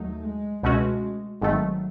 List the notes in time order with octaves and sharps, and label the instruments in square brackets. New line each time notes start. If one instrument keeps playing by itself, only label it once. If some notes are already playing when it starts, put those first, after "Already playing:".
Already playing: [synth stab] D#2 F#3 D#4 [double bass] A3
[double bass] G#3
[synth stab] C#2 B2 A3 C#4 F#4 [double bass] G#3
[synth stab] G#1 G#2 D#3 A3 [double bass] F#3